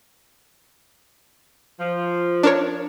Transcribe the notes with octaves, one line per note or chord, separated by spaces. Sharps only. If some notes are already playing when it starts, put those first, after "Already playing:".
F3
D4 A#4 C#5